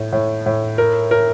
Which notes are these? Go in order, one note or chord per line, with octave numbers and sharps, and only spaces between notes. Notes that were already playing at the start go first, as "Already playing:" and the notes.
Already playing: A2
A2
A2
A#4
A#4